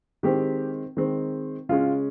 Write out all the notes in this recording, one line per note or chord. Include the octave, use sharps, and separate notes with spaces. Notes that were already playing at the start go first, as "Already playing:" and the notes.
D#3 G#3 C4 G4
D#3 G#3 C4
C#3 G#3 C#4 F4